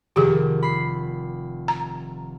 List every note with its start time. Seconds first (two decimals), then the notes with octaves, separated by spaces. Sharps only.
0.16 F1 D#3 G4 G#4
0.63 B5 C7
1.68 A#5